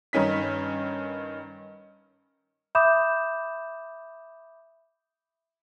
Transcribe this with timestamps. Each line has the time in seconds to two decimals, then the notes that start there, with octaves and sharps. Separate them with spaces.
0.13 G2 D#3 C#4 D#4 B6
2.75 E5 B5 D6 D#6 G6 E7